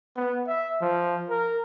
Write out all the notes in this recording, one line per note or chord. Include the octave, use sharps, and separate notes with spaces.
B3
E5
F3
A#4